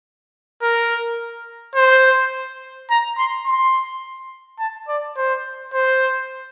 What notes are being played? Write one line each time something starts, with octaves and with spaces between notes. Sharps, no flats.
A#4
C5
A#5
C6
C6
A5
D5
C5
C5